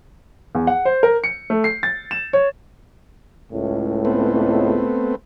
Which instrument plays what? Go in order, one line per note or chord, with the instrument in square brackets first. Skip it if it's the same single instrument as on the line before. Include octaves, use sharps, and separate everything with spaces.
[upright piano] E2
F#5
C5
A#4
C#7
A3
C7
A6
E7
C#5
[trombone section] C#2 A2
[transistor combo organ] A3 B3 C4